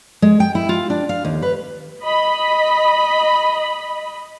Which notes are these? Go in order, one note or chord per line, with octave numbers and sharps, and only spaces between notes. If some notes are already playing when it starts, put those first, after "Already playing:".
G#3
G5
E4
F4
D4
F5
D#2
B4
D#5 B5